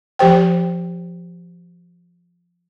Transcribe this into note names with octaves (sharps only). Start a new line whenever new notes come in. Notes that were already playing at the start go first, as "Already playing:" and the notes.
F3 G4 C5 G5